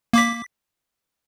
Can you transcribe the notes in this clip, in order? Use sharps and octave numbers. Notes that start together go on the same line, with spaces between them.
A#3 D6 B6